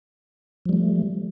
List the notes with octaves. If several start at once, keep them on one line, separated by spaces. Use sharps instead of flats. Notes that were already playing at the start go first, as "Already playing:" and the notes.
F3 G3 A3